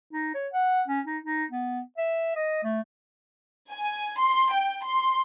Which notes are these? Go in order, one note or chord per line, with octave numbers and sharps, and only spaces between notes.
D#4
C#5
F#5
C#4
D#4
D#4
B3
E5
D#5
A3
G#5
C6
G5
C6